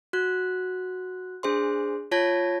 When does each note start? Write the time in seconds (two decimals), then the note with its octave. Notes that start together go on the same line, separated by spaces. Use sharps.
0.13 F#4 F#6
1.43 D4 G#4 C5 C6
2.11 F4 C#5 A5 G#6 A#6